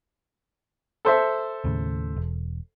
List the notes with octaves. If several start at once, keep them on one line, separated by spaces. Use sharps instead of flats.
A4 C5 E5
D#2 A2 C#3
E1